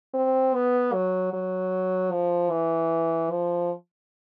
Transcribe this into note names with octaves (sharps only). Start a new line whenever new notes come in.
C4
B3
F#3
F#3
F3
E3
F3